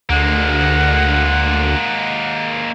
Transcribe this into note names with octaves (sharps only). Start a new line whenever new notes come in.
D2 G#3 A#3 F#5